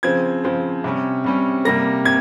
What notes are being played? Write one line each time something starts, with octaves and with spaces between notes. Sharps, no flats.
C#3 F3 C4 G#6
C#3 F3 C4
C3 G3 C#4
C3 G3 C#4
C3 G3 A#3 A#6
C3 G#6